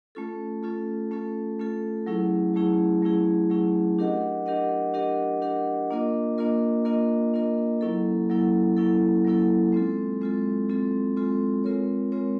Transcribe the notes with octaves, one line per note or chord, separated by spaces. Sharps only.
A3 C#4 F4 A4
A3 C#4 F4 A4
A3 C#4 F4 A4
A3 C#4 F4 A4
F#3 A3 C#4 E4 G#4
F#3 A3 C#4 E4 G#4
F#3 A3 C#4 E4 G#4
F#3 A3 C#4 E4 G#4
D4 G4 A#4 D#5 F#5
D4 G4 A#4 D#5 F#5
D4 G4 A#4 D#5 F#5
D4 G4 A#4 D#5 F#5
A#3 D4 F4 A#4 D#5
A#3 D4 F4 A#4 D#5
A#3 D4 F4 A#4 D#5
A#3 D4 F4 A#4 D#5
F#3 A#3 C#4 E4 A4
F#3 A#3 C#4 E4 A4
F#3 A#3 C#4 E4 A4
F#3 A#3 C#4 E4 A4
G#3 C4 F4 A4
G#3 C4 F4 A4
G#3 C4 F4 A4
G#3 C4 F4 A4
G#3 C4 F4 A#4 C#5
G#3 C4 F4 A#4 C#5